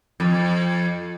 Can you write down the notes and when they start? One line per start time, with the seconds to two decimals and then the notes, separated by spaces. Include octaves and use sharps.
0.20 F2